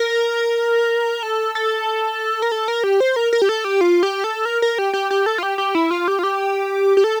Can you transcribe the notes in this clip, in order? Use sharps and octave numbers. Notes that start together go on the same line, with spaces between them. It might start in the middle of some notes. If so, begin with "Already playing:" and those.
Already playing: A#4
A4
A4
A#4
A4
A#4
G4
C5
A#4
A#4
G4
A4
G4
F4
G4
A4
A#4
A#4
G4
G4
G4
A4
F4
G4
G4
E4
F4
G4
F4
G4
G4
A4